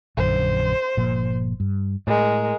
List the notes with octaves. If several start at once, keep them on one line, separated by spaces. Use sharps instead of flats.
A#1 F#2 D3 C5
G1 A#2 F3
G2
A2 G#3 A#4